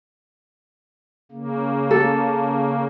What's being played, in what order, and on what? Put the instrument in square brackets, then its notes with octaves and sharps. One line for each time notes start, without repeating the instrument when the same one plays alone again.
[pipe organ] C#3 A#3
[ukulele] A4